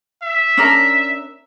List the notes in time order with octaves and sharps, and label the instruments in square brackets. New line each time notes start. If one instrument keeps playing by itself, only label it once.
[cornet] E5
[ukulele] C#4 D4 A#4